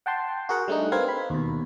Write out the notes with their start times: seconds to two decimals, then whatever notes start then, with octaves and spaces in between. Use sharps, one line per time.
0.06 F#5 G5 A5 C6
0.49 F#4 G#4 A#4 F#5
0.68 G3 A3 D4 D#4
0.92 C4 A#4 B4 F5 C6 G#6
1.08 B5
1.30 D#2 B2